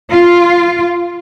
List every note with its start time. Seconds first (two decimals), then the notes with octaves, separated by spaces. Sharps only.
0.10 F4